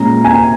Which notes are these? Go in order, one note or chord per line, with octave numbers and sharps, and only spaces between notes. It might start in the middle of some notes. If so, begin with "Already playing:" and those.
Already playing: A#2 G#3 C#4 A#5
G#5